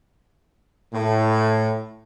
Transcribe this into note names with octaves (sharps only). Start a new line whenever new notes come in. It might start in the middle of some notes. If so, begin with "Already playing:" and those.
A2